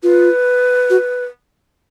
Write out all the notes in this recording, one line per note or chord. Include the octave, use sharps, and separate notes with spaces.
F4 B4
F#4